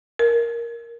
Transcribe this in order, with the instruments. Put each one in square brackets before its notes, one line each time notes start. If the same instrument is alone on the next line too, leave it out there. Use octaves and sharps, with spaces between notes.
[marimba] A#4